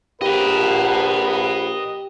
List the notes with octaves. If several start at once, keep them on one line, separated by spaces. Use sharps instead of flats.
A#1 F3 G4 A#4 B4 D#5 F#5